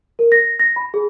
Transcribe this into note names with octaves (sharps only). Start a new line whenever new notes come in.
A#4
A#6
A#6
B5
G#4